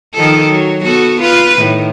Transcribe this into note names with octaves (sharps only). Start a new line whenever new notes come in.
D#3 F3 A4
F#3
B3 F#4 A4
F4 B4
A2 D#3